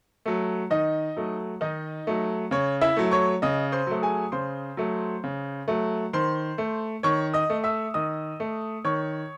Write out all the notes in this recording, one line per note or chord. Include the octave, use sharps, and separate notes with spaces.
F#3 A3
D#3 D#4 D#5
F#3 A3
D#3 D#4 D#5
F#3 A3
C#3 C#5
E4 E5
F#3 A3
C#5 C#6
C#3 D#5 D#6
C5 C6
F#3 A3
G#4 G#5
C#3 C5 C6
F#3 A3
C#3
F#3 A3
D#3 C5 C6
A3
D#3 C#5 C#6
D#5 D#6
A3
E5 E6
D#3 D#5 D#6
A3
D#3 C#5 C#6